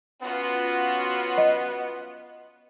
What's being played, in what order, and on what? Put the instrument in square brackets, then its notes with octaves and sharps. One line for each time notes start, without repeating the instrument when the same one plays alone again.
[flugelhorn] B3 [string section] C#4 F4 F#4
[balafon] D#5